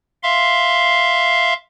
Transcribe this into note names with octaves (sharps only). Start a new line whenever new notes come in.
E5 F5 C6